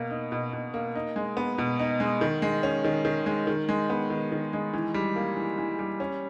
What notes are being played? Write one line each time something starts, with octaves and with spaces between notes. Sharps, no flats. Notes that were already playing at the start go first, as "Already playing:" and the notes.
Already playing: B2 A#3
D#4
B2
B2
A#3
D#4
G#3
B3
B2
D#4
G#3
D#3
G#3
C#4
D#3
D#3
G#3
D#3
G#3
B3
D#3
D#3
G#3
E3
G3
A#3
E3
E3
G3
C#4